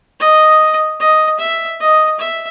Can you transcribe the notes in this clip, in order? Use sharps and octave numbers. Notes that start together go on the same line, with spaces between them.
D#5
D#5
E5
D#5
E5